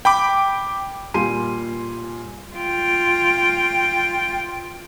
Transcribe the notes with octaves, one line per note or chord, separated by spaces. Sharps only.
G5 B5 D6
A#2 G3 G4 G#5 C6 D#7
F4 G5